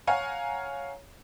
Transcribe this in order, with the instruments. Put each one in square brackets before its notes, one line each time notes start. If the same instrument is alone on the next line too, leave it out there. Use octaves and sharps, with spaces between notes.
[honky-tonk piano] C#5 F5 F#5 G#5 A#5